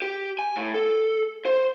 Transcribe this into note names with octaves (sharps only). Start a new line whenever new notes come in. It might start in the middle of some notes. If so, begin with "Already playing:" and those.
G4
G#5
A2
A4
C5